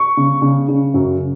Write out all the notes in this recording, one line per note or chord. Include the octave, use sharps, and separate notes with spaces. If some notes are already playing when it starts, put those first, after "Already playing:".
Already playing: C#6
C#3
C#3
C#3
F#2